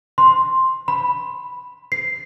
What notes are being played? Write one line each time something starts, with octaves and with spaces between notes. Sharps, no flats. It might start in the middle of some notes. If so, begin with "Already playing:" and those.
C6
B5
C7